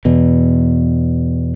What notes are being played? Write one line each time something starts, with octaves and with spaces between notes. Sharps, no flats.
E2 B2